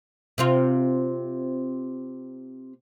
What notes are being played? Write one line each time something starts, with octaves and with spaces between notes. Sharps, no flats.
C3 C4 F4